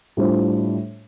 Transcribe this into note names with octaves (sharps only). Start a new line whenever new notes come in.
A2 G3 D4 F4 C5